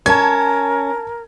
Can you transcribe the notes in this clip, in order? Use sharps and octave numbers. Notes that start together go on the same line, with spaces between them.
C#4 A#4 A5 G#6